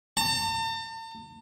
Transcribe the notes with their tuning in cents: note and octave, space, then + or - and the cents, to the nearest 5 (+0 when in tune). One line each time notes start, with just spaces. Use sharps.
A5 +45